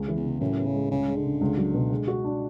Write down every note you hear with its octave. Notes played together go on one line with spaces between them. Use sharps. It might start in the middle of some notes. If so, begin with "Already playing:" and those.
Already playing: C#2 C#4
E3
E2
C#3
F#2 A2
B3
C#3
G#3
C#2 C#3
G#3
D3
C#3
C#2
F#3
B2
G#3
F#4
D4